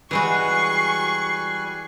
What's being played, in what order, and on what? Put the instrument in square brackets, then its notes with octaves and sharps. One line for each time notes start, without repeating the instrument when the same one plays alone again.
[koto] E3 G#3 F#4 [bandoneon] G3 G#5 F#6 [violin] C#6 [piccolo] C7